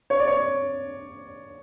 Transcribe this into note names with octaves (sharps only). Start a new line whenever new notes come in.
C#5
D5
C#5